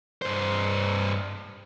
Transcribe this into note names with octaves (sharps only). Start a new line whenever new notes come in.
G2 C5